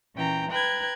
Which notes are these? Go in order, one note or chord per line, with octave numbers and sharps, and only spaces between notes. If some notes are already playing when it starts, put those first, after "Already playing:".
A#2 E3 C#4 G5 A#5
B4 G5 A#5 F#6 G#6